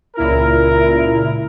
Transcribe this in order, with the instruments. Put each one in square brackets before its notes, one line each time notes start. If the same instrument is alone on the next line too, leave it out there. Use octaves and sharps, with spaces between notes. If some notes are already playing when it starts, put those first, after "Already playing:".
[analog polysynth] C#2 A#2 E4 [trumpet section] A#4